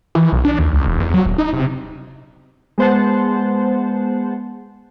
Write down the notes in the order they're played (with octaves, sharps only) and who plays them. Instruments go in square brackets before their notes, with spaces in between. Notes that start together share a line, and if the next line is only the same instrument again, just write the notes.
[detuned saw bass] E3
B1
D4
D#2
C#2
E1
E2
F#3
D#1
D#4
C3
[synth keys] G#3 B3 C5 F#5 A5